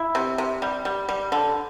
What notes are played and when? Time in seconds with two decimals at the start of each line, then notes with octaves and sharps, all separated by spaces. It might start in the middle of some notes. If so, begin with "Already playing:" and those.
Already playing: E4
0.15 C3
0.38 C3
0.62 G3
0.85 G3
1.09 G3
1.32 D3